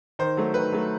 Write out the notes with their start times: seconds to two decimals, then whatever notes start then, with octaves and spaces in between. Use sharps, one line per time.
0.19 D#3 C5
0.37 F#3 A3
0.54 D#3 B4
0.72 F#3 A3